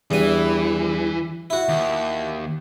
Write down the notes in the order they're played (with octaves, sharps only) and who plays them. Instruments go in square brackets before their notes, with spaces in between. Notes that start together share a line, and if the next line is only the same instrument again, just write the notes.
[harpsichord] E2 G2 G#5 [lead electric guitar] E3
[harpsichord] E4 F#4
[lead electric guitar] D#2